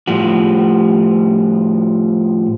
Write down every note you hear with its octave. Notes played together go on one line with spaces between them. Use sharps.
A2 F3 G3 A3 F#4